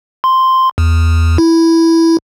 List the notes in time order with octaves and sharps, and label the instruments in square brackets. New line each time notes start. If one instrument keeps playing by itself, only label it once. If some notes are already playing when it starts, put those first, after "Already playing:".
[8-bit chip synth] C6
E2
E4